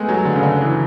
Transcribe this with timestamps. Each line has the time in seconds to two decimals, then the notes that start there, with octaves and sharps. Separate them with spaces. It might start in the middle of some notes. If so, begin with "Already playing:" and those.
Already playing: G#3 A3 B3
0.09 F#3
0.25 D3
0.35 C#3
0.43 D3
0.61 E3